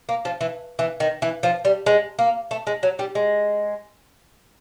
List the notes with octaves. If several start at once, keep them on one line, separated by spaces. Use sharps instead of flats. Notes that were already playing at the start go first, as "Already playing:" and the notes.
A#3
F3
E3
E3
D#3
E3
F3
G3
G#3
A#3
A3
G#3
F#3
G3
G#3